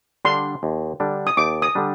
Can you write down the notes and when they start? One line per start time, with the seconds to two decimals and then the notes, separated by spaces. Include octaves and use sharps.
0.25 D3 G3 D4 C6
0.63 D#2
1.00 D3 G3 D4
1.27 D#6
1.37 D#2 D6
1.62 D#6
1.75 D3 G3 D4